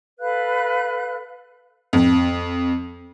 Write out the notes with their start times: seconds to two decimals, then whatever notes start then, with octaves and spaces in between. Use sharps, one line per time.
0.19 A4 B4 F5 F#6
1.93 F2